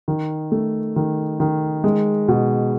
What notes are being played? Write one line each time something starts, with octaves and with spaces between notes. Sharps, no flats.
D#3
A3
D#3
D#3
G#3
B2